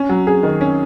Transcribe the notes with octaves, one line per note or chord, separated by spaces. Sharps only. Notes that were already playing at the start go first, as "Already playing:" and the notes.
Already playing: C#4
F#3
G#4
D#3
C#4